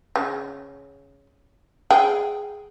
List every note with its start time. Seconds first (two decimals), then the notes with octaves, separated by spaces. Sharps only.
0.16 C#3
1.91 G#4 G5